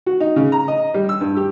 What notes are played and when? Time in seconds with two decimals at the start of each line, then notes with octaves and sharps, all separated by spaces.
0.06 F#4
0.20 D#4
0.36 C#3
0.52 A#5
0.68 D#5
0.94 G3
1.09 E6
1.21 G2
1.37 G4